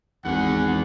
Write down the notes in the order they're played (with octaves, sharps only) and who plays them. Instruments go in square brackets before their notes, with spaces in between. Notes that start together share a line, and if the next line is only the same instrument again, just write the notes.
[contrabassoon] G#1 [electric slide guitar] E2 G#4 [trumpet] F#5